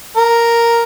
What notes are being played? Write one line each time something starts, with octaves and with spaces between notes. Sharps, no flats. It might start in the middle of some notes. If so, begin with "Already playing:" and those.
A#4